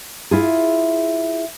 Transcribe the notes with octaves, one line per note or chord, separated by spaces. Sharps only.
E4 F4 G#4